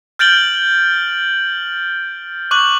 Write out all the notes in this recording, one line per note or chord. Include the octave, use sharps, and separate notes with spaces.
F6 G6 A6 D7 F#7 G7
C#6 D6 F#6 F#7